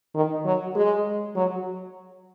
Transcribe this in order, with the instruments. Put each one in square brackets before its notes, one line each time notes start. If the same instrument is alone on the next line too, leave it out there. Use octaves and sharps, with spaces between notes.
[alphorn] D#3
F#3
G#3
F#3